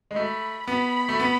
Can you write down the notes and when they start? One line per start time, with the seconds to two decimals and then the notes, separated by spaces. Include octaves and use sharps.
0.11 G#3
0.15 A3 B5
0.68 B3 B5
1.09 A3
1.20 B3